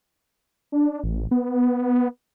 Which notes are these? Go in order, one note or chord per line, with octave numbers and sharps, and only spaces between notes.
D4
A1
B3